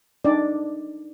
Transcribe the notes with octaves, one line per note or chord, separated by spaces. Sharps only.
D4 D#4 D5